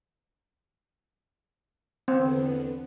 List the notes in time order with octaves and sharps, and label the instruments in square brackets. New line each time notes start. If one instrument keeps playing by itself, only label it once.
[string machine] E2 D3 B3 [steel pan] C4